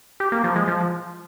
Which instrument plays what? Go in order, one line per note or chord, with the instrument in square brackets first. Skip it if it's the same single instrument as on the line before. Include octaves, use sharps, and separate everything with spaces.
[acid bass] G4
A#3
F3
G#3
F3